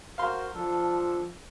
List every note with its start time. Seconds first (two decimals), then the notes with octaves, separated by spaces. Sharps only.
0.18 F#4 A#4 C5 F5 C6
0.54 F3 D4 A4